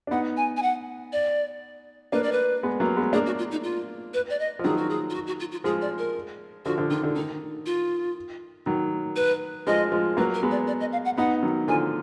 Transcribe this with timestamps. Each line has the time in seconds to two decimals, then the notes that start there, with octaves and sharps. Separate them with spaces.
0.07 D4
0.11 B3 D#4 F#5
0.37 G#5
0.57 G#5
0.63 F#5
1.12 D5
2.12 A#3 D4 B4
2.23 D5
2.32 B4
2.63 G#3 B3
2.80 F#3 A#3
2.96 G#3 B3
3.13 A#3 D4 G#4
3.26 F#4
3.38 F4
3.51 D#4
3.64 F4
4.14 B4
4.30 D5
4.39 D#5
4.59 F3
4.64 D#3 F#3 G#4
4.77 F#4
4.90 G#4
5.10 F4
5.15 F#4
5.27 F#4
5.40 F4
5.52 F4
5.64 F3 G#3 G#4
5.81 D5
5.98 A#4
6.65 D3 F3 F#4
6.78 D3 F3
6.90 D#3 F4
7.03 D3
7.16 D#3 D#4
7.66 F4
8.66 D#3 F#3
9.16 B4
9.67 F3 G#3 D#5
9.92 F3 G#3
10.17 F#3 A#3 B4
10.34 A#4
10.43 G#3 B3
10.51 D5
10.67 D5
10.80 D#5
10.92 F5
11.05 F#5
11.17 B3 D#4 F#5
11.42 D#3 F#3
11.68 D3 F3 G#5